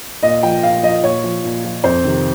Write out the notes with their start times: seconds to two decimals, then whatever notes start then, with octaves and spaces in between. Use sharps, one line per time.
0.23 A#2 D#5
0.43 F3 G5
0.63 A#2 F5
0.83 F3 D#5
1.04 A#2 C#5
1.24 F3
1.44 A#2
1.64 F3
1.84 F2 C5
2.04 C3 D#3